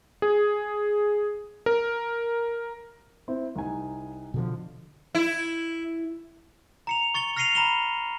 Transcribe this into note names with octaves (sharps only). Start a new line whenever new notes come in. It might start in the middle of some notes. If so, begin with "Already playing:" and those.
G#4
A#4
C4 E4
C2 D#4 G#5
B2 D3 F3
E4
A#5 C#7 F7
C#6 A6 C#7 G7
F6 A#6 C7 C#7 D#7 F7
A#5 B5 E7 F7 G7